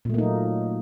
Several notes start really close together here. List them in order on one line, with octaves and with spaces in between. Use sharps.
A#2 A3 A#3 D#4 F#3